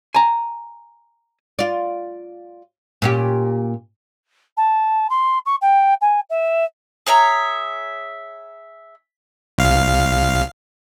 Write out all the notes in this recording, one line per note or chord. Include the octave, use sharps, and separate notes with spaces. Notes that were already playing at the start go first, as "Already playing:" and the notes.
G#5 A#5
F4 D5
A#2 C#4 G4
A5
C6
C#6
G5
G#5
E5
G#4 C#5 E5 A#5
C2 F5